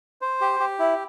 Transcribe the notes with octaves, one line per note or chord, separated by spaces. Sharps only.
C5
G4
G4
E4